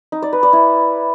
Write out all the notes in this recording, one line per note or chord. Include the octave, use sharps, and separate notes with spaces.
D#4
D5
B4
D5
E4